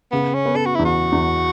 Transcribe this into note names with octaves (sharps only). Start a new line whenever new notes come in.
C#3 B3
C#4
B3
A4
F#4
E2 E4
F#4
E2